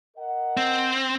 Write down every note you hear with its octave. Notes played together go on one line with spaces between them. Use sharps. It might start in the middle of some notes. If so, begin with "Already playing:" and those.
A#4 D#5 F#5
C4